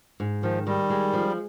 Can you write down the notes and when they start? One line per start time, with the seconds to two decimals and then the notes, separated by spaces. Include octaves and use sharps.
0.20 G#2
0.43 D#3 F3
0.67 D#3 G3
0.90 G#3
1.13 F3